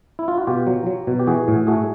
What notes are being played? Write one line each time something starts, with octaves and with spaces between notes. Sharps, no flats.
E4
F4
F#4
B2 F4 G4
F#3
F#3
B2
G4
E3 F#4 G#4
A2
A3 F#4 G#4